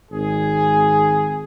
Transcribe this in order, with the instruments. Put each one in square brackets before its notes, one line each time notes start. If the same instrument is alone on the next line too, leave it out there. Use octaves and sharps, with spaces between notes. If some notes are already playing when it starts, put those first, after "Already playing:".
[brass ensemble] G#1 G#4